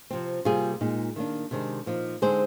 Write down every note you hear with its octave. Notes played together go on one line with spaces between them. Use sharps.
C3 F3 C4
C3 G3 A#3 F4 G#4
A#2 G#3 D#4
D#3 A#3 D4
C3 D#3 G#3 D4
A#2 F3 A#3 D#4
D3 G#3 C4 D#4 G#4 C5